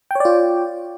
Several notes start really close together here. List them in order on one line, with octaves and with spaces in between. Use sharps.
G5 C#5 D5 F4